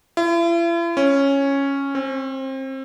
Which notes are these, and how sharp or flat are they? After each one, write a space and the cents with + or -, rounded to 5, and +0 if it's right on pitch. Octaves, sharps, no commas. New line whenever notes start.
E4 +45
C#4 -5
C4 +30